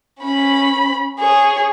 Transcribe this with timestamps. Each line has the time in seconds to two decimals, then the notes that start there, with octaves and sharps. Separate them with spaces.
0.21 C#4 B5
1.20 G#4 C#5